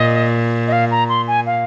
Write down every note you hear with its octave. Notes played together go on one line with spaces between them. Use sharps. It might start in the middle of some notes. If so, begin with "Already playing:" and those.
Already playing: A#2 D#5
D#5
F5
A#5
C6
G#5
F5